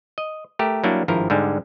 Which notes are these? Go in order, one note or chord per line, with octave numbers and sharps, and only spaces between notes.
D#5
A3 G4 A#4
F#3 G3 A#3 D4 E4
G#1 G2 F3 E4 A#4
G#2 D3 G3 G#3